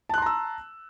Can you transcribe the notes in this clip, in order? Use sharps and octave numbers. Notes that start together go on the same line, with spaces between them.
A5 A#5 C6 E6 F#6